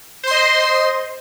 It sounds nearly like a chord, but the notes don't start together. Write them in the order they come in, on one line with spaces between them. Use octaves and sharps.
C5 C6 D#5